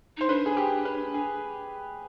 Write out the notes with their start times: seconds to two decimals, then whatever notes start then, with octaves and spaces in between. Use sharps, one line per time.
0.17 D#4 C5
0.29 D4 B4
0.46 G#4
0.57 G4
0.85 B4
1.14 G#4